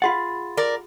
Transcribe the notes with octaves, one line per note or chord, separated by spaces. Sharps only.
F4 G#4 F#5 B5 C6 A6
A#4 D5